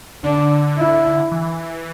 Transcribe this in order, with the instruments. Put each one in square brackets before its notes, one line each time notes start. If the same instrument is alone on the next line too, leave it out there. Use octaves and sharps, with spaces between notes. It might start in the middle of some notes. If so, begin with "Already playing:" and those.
[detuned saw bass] D3 [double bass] D4
[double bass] E4
[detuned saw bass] E3